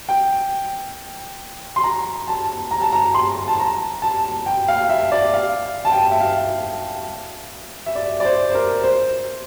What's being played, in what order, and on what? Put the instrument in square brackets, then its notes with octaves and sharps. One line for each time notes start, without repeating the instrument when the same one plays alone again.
[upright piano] G5
C6
A#5
A5
A#5
A5
A#5
C6
A5
A#5
A5
G5
F5
E5
D5
F5
A5
G5
E5
F5
E5
D5
D5
C5
C5
A#4
C5